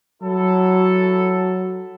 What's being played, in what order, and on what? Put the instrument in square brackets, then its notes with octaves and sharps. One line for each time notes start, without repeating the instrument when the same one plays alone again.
[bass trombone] F#3 [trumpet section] E4 A4